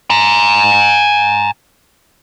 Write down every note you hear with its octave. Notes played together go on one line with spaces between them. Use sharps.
G#5 A#5